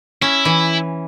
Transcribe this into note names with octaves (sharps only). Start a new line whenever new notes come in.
C#4 E4
E3